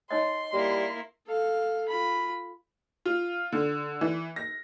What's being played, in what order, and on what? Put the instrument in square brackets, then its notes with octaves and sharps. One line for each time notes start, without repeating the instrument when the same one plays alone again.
[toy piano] D#4 C#5 D#5 [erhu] C6
[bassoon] G3 [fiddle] A#3 E4
[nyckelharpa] A4 F5
F4 B5
[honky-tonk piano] F4
D3
E3
A#6